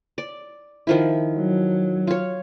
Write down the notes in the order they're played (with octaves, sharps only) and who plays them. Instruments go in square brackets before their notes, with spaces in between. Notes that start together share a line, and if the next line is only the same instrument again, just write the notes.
[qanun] D5
D#3 F3 E4
[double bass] F#3
[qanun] F4 C#5